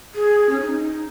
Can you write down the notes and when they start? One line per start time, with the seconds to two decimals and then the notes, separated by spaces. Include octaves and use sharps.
0.15 G#4
0.50 C#4
0.61 D#4